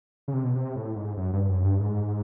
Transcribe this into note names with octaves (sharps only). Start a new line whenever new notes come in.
C#3
C3
B2
C3
A2
G#2
F#2
G2
F#2
G2
G#2